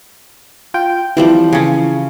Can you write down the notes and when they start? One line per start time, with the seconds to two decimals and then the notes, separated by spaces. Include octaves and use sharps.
0.74 F4 G5
1.17 E3 F3 G3 C4
1.53 C#3 C#4